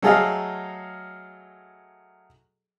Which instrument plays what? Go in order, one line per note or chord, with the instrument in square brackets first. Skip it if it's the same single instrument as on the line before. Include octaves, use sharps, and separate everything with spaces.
[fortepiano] F#3 A3 G#4 A4 D#5 F5